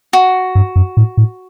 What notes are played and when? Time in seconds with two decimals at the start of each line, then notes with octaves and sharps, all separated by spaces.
0.13 F#4
0.55 G2
0.76 F#2
0.97 A2
1.17 A2